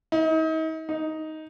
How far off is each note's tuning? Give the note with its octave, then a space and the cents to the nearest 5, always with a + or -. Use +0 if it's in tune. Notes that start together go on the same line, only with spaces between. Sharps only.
D#4 +40
D#4 +10